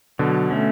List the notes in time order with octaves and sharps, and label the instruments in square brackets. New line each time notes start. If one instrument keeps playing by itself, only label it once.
[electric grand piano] B2 D3 [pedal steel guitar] F#3
[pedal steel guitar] A3 C#4